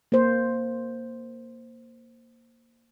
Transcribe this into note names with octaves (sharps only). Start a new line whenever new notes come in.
A#3 C5